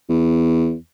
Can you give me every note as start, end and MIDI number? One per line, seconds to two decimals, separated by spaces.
0.09 0.74 40